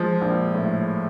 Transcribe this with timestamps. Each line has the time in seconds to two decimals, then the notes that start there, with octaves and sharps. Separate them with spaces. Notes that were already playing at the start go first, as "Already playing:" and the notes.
Already playing: F3 G#3
0.21 A#1
0.54 A2